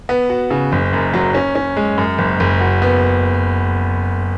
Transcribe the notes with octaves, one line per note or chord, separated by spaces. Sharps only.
B3
F#4
C#3
F#1
F#2
F#3
C#4
C#4
G#3
F#2
F#1
F#1
F#4
B3